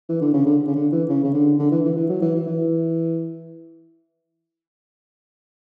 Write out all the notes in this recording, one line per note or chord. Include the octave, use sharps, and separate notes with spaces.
E3
D3
C#3
D3
C#3
D3
E3
C#3
C#3
D3
D3
E3
E3
E3
F#3
E3
E3
E3